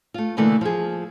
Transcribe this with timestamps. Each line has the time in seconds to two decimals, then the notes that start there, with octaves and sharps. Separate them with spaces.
0.14 A3 F4
0.37 B2 D3 E3 A3 A#3
0.61 F3 G#4